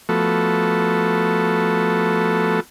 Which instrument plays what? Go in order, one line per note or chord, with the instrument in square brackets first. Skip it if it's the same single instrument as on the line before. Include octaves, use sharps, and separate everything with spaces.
[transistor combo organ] F3 A3 B3 F#4 A4